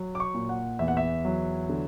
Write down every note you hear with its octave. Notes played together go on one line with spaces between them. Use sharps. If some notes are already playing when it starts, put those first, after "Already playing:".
Already playing: F#3
D6
C#6
A#2
F#5
E2 E5
F#5
E5
F#3
D3